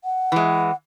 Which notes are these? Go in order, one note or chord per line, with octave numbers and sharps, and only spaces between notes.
F#5
E3 G#3